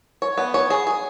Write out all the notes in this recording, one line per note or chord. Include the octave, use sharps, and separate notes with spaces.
C#5
B3
C#5
G#4
G#4